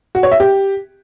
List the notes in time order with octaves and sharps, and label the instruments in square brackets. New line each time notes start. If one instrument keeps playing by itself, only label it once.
[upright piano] F#4
C#5
E5
G4